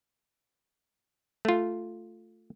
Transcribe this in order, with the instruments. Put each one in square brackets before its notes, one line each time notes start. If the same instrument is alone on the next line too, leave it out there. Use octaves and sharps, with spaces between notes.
[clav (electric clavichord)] A3 F4